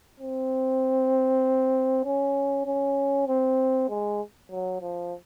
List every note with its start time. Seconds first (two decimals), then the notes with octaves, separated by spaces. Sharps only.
0.20 C4
2.05 C#4
2.66 C#4
3.28 C4
3.89 G#3
4.51 F#3
4.82 F3